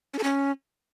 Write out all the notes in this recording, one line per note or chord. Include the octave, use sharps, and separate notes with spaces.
C#4
A4
C#4